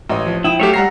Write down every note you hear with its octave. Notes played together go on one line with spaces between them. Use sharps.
A1 C#5 D#5
F3
E4 G5 D#6
F#3 A3 G4 C#5 E5 F5
G3 F#5 A#5 A#6 C7